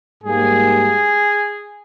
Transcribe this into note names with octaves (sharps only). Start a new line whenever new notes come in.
G#2 G3 A#3 G#4